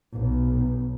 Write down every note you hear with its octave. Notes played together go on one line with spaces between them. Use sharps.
B1